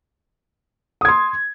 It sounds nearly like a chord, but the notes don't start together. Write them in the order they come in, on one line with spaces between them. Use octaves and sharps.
D#6 G#6 C6